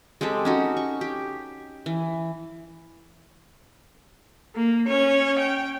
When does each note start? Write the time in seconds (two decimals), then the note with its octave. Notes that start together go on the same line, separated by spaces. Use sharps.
0.21 G#3 C4 G4 A4
0.45 C#4 D#4 F#4
0.77 C#6
1.01 G4
1.86 E3
4.55 A#3
4.88 C#4 C#5
5.39 G5